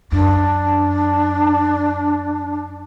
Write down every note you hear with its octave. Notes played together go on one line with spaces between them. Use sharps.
F#2 D4